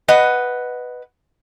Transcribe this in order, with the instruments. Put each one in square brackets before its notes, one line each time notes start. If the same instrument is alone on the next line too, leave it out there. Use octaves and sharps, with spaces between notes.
[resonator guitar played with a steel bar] B4 D#5 F#5